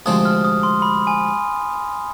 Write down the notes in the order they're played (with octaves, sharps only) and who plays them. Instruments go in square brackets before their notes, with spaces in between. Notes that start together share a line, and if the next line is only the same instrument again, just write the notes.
[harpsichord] D2 C3 F3 G#3 C4 [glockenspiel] D#6
[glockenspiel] F6
D#6
C6
B5
G#5